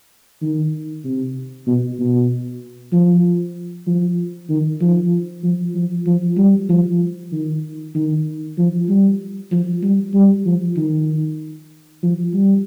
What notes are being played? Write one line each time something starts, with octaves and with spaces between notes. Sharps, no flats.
D#3
C3
B2
B2
F3
F3
D#3
F3
F3
F3
F3
G3
F3
D#3
D#3
F3
G3
F3
G3
G3
F3
D#3
F3
G3